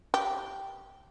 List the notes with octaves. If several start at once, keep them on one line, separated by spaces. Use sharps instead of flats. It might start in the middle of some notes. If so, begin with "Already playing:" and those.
G4